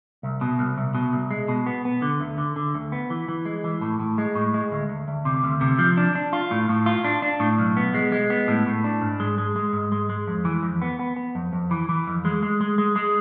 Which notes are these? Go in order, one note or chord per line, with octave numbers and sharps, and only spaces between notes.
C2
B2
C2
C2
B2
C2
G#3
B2
B3
B3
D3
D2
D3
D3
D2
B3
E3
E3
G#3
E3
A2
A2
G#3
A2
G#3
D2
D2
D2
C3
D2
C3
F3
D4
D4
F4
A2
A2
F4
D4
D4
A2
B1
B3
G#3
G#3
B3
A2
A2
D4
G#2
G#3
G#3
G#3
G#2
G#3
G#3
F2
E3
F2
B3
B3
B3
F2
F2
E3
E3
F2
G#3
G#3
G#3
G#3
G#3